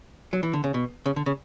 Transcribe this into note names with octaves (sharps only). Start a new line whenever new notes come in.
F#3
E3
D3
C#3
B2
C#3
D3
C#3